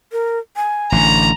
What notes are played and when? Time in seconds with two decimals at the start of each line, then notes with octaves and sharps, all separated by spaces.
0.12 A#4
0.56 G#5
0.92 A1 D3 A#5